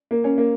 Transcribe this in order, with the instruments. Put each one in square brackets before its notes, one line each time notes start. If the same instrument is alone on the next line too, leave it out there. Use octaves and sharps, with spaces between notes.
[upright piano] A#3
C#4
A#3